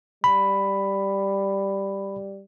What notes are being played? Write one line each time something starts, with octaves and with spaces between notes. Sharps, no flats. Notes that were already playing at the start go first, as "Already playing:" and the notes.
G3 B5